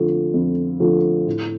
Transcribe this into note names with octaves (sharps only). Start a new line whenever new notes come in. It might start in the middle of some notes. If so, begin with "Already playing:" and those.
Already playing: F2 D3 F3 A3
F2
D3 F3 A3
A2